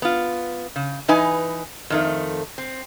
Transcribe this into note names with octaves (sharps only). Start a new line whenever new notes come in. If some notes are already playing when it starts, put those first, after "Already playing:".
B3 F4
C#3
E3 D#4 B4 G#5
F2 D#3 A3
C4